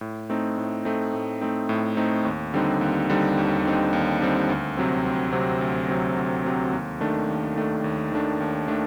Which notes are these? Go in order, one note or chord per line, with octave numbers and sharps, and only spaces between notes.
A2
A3 C4 D#4
A2
A3 C4 D#4
A2
A3 C4 D#4
A2
A3 C4 D#4
D#2
D3 G3 C4 D#4
D#2
D3 G3 C4 D#4
D#2
D3 G3 C4 D#4
D#2
D3 G3 C4 D#4
D2
C3 F#3 C4
D2
C3 F#3 C4
D2
C3 F#3 C4
D2
C3 F#3 C4
D#2
D#3 A3 D4
D#2
D#3 A3 D4
D#2
D#3 A3 D4
D#2
D#3 A3 D4